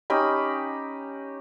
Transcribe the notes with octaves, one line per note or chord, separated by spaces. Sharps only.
C#4 D#4 G4 B5